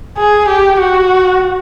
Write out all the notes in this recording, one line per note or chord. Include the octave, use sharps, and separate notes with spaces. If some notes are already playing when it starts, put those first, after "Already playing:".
G#4
G4
F#4